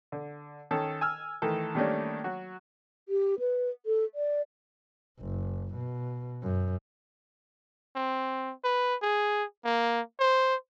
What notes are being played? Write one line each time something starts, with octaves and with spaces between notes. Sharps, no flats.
D3
D#3 C#4 A4
G#5 E6 F6
D#3 E3 A3 A4 A#4
D#3 G3 A3 A#3 C#4 D4
F#3 F#4
G4
B4
A4
D5
F#1
B2
F#2
C4
B4
G#4
A#3
C5